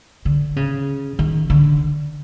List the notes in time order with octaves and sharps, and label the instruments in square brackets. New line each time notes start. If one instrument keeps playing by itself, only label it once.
[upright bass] D3
C#3
D#3
D3